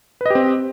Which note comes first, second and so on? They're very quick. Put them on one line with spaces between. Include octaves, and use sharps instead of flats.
B4 D#5 G4 C4